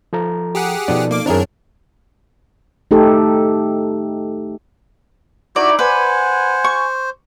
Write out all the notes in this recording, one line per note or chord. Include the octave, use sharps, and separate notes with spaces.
F3 A4 A#5
G4 G#4 F#5
B2 F3 D#4 A4 D5
A#3 D6
F#2 D#3 C4 D4 E4 G#4 A#4
A3 D#4 G4 A4
D#4 E4 F#4 D5
B4 C5 F#5 G#5
C#6